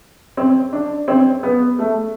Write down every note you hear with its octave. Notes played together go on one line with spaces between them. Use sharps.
C4
D4
C4
B3
A3